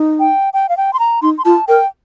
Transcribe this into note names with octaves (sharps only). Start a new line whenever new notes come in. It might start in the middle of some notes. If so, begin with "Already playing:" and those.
Already playing: D#4
G5
G5
F5
G5
C6
A#5
D#4 C6
C6
F4 A5
A#4 G5